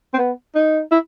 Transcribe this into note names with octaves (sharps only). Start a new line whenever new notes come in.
C4
B3
D#4
E4